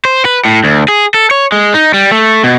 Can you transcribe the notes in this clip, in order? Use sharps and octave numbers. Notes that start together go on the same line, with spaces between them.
C5
B4
A2
D2
G#4
A4
C#5
G#3
D#4
G3
A3
B2